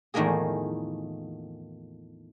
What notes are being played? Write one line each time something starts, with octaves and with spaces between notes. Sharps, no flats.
E2 A2 D#3 F3 A#3 G#4